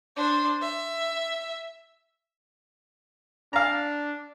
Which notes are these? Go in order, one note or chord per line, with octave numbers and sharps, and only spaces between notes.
D4 C5
E5
D4 F5 A#5